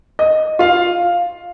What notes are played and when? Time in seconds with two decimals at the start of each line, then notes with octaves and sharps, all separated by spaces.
0.19 D#5
0.59 F4 F5